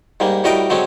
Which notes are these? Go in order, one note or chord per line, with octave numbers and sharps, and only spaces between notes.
G#2 G3 A#3
A2 G3 F#4 A#4 D#5 G5
D3 F#3 G#3 C4 C#4